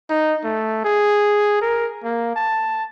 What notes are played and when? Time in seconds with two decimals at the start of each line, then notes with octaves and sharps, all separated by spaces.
0.10 D#4
0.44 A3
0.85 G#4
1.62 A#4
2.04 A#3
2.36 A5